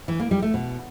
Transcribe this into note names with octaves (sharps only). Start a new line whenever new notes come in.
E3
A#3
G3
A3
B2